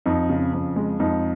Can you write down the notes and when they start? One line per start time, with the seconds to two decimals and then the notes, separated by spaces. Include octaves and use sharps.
0.06 F2 D#4
0.30 C#3
0.53 F2
0.76 G#3
1.00 F2 D#4